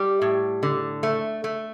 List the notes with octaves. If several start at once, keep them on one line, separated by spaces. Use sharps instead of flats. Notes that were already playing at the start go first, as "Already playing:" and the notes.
Already playing: G3 G4
A2
D3
A3
A3